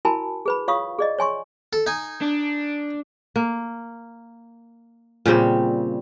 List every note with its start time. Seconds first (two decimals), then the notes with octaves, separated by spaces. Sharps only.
0.05 E4 F#4 A#4 G#5 A5 B5
0.46 G#4 B4 B5
0.68 F4 C#5 F5 C#6 D#6
0.99 G#4 D5 D#5
1.19 C#5 G#5 C6 C#6
1.73 A4
1.87 D#4 G#5
2.22 D4
3.36 A#3
5.26 A#2 C#3 G3 C4